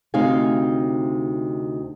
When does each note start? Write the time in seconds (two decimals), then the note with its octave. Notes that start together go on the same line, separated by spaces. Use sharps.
0.14 D2 C3 D#4 F5 G#5